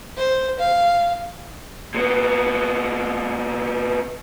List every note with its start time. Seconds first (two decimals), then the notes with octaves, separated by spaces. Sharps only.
0.17 C5
0.60 F5
1.94 A#2 B3